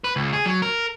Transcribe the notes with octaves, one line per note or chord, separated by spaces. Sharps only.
B4
C#2
G#4
F#3
A#4